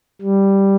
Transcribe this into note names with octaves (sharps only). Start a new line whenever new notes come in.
G3